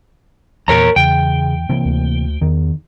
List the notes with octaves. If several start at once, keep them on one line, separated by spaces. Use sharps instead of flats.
E2 A#2 A#4 C#5 A#5
E2 C#3 G5
C3 E3 A#3
D2
E2 D#3